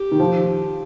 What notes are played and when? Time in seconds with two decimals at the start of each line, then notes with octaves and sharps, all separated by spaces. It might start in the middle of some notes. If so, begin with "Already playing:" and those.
Already playing: G4
0.12 D#3
0.19 F3